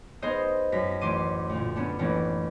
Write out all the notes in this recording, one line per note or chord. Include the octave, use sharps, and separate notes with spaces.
B3 D#4 G#4 A#4 C5 D#5
F#2 A#6 B6
A1 C6 D6 D#7
D2 A#2
B3 C#4 D4
A1 A#3 B3 D4